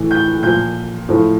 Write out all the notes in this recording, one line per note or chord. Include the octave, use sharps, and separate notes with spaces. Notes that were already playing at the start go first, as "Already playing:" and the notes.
Already playing: A2 E3
G6
A#2 F3 G6
A2 F3